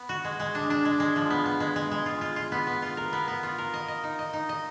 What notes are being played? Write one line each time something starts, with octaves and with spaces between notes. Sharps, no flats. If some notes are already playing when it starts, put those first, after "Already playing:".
Already playing: B3
F#4
G#3
G#3
D4
D4
G#3
G#3
F3
B3
B3
G#3
G#3
G#3
F4
F4
F4
B3
B3
F4
A#4
B3
B3
F4
A#4
D#5
D#5
D#4
D#5
D#4
D#5